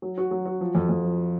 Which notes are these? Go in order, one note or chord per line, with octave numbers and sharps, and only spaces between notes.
F#3
F#4
F#3
F#4
F3
F2
F2
F3